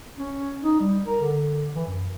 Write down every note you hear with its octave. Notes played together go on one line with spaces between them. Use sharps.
C#4
D#4
G3
A#4
D3
E3
F#2